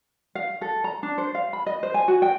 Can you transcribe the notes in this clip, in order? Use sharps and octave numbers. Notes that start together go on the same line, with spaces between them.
F5
A4
A#5
D4
C5
F5
B5
D#5
C5
G#5
F#4
G5